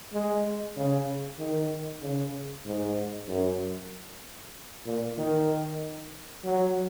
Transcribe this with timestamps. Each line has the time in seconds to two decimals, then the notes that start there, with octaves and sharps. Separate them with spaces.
0.13 G#3
0.77 C#3
1.39 D#3
2.02 C#3
2.66 G#2
3.28 F#2
4.86 A#2
5.18 D#3
6.44 F#3